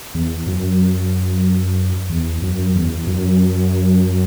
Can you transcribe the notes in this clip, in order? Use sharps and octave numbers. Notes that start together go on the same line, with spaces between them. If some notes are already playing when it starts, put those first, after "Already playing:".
E2
F#2
E2
F#2
E2
F#2